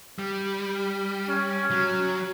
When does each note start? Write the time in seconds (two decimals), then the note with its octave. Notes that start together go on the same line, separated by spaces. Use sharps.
0.19 G3
1.29 C#4
1.71 F#3